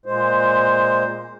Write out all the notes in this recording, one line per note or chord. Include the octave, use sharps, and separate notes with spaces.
A#2 G#3 C5